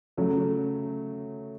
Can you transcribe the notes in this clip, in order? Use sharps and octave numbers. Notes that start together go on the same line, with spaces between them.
C#3 F#3 A3